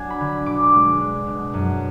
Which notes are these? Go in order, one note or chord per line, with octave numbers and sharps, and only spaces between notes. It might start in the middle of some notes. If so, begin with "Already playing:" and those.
Already playing: F#3 D4 G#5
B5
D3
B2 D6
G#3
D4
B2
F#2